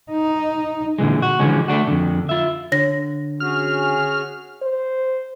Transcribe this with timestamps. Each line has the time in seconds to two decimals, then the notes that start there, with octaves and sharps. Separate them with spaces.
0.12 D#4
0.99 A#2 D3 E3 G#3
1.22 F#4
1.40 D3 E3 F3 G#3 C#4
1.68 A3 A#3 D4 F#4
1.88 F2 D3
2.29 F4 E5
2.72 D3 C#5 A#6
3.40 C#4 F#4 G#4 F6
4.62 C5